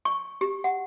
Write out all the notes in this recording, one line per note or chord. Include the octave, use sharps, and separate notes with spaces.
C#6
G4
F#5